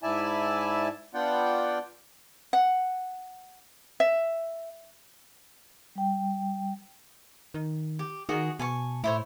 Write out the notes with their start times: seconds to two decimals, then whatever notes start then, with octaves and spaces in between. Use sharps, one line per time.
0.03 G#2 E4 D5 E5 G#5 A5
1.14 B3 D4 F4 D5 F#5 G5
2.53 F#5
4.00 E5
5.95 G3 G5
7.54 D#3
7.99 G4
8.29 D#3 F#4 G#4 D#5
8.59 B2 G#5 A5 C#6
9.04 A2 E4 C5 C#5